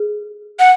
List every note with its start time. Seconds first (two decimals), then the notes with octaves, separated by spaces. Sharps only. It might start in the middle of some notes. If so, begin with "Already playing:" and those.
Already playing: G#4
0.60 F#5